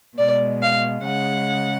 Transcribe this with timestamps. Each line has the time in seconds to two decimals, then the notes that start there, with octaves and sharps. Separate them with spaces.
0.18 B2 G#3 D5
0.62 F5
1.05 C#3 G#3 F#5